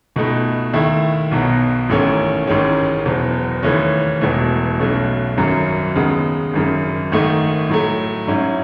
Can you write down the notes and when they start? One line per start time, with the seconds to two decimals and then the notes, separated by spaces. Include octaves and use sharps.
0.16 C#2 B2 A3 D#4
0.73 D#2 D#3 A3 E4
1.31 B1 B2 F#3 B3
1.89 A1 G#2 D#3 A3 C#4
2.47 A1 G#2 D#3 G#3 C#4
3.05 F#1 E2 B2
3.63 D#2 C#3 E3 A3 C#4
4.21 E1 E2 B2 A3
4.79 B1 B2 A3 C#4
5.37 G#1 F#2 C#3 F#3
5.95 D#2 C#3 G#3 B3
6.53 G#1 F#2 C#3
7.12 G#1 G#2 D#3 A3 D#4
7.69 A2 F#3 A3
8.27 G#2 F#3 C#4 E4